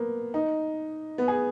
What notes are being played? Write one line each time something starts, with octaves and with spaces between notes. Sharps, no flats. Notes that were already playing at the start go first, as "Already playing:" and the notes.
Already playing: A#3 B3
D#4
B3
G#4